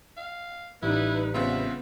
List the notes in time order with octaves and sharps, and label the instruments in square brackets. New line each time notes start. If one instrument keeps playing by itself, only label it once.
[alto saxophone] F5
[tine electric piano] A1 G3 [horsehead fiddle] D#4 B4 [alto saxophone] E4
[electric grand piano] C#3 C4 F4 [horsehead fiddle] B3 [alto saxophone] E5